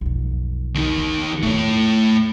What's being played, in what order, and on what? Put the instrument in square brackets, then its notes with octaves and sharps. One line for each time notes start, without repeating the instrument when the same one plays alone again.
[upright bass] B1 F2
[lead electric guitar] D#2 D#4
[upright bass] B3
[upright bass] E2 A2 [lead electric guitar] A3 C#5